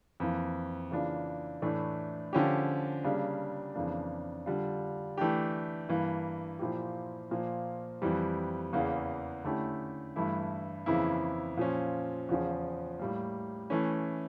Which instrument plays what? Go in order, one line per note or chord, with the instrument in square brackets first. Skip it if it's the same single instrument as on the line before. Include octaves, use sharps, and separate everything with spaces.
[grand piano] F2 E3 A#3
C#3 E3 A#3 D4 F4
A2 E3 A3 D4
D3 F3 C#4 G4
C#3 G3 A#3 D4
F2 C#3 E3 A#3 D4
D3 G3 D4 F4
E3 A3 D4 G4
G2 E3 A#3
A#2 F3 A#3 E4 G4
A#2 F3 A#3
F2 E3 G3
E2 C#3 E3 A#3
D3 A3 C#4 E4 G4
G2 E3 A3 E4
F2 C#3 E3 A#3 E4
A#2 F3 C#4
E2 C#3 F3 C#4
A2 G3 A#3
E3 A3 C#4